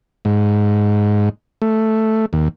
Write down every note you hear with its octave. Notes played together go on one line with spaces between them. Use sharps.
G#2
A3
D#2